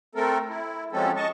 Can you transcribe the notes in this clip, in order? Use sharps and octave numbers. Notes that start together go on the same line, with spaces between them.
A3 C4 A4 A#4
E4
F3 F#3 G#3 C4 C#4 A4
D#5 A5 C#6